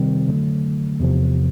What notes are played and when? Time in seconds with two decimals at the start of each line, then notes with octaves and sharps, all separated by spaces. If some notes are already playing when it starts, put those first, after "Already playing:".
Already playing: C3 D#3 G3 C4
0.29 D3 F#3 A3
1.00 E2 C3 F3